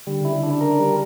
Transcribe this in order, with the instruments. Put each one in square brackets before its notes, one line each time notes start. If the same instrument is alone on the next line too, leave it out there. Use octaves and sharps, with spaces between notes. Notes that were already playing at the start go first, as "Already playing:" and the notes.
[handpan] D3 [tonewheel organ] G3
[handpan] C#3
[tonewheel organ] E4
[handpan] D3
[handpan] C#3 [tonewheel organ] D4
[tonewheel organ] A#4
G3